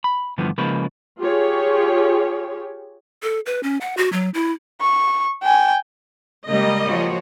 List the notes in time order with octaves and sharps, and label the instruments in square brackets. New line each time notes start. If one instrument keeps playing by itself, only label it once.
[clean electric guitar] B5
G2 D3 E3 F3 B3
C#3 F3 G#3 A#3 B4
[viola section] F4 G4 G#4 C#5
[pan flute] A4
B4
C#4
F#5
F#4
F#3
E4
[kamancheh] C#6
G5 G#5
[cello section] C#3 G#3 [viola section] G3 A#3 D#5
[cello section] F3 F#4 C#5